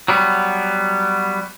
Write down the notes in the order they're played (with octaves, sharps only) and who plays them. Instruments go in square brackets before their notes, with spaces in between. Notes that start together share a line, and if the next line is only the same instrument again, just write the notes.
[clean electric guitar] F#3 G3 B3